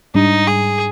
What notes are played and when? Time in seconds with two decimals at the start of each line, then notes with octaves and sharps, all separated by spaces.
0.15 G#2 G3 D4 D#4
0.47 G#4